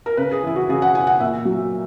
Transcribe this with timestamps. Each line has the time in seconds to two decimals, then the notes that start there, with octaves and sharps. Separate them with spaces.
0.06 A#4
0.17 C#3 B4
0.31 G#4
0.43 E3 E4
0.56 F#4
0.69 C#3 G#4
0.82 F#5
0.94 E3 G#5
1.07 F#5
1.20 A#2 E5
1.45 F#3